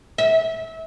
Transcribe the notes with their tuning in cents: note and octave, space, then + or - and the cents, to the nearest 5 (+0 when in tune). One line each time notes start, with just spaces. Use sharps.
E5 -25